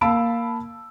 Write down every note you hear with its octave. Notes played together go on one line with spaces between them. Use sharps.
A#3 F5 A5 B5 E6 D7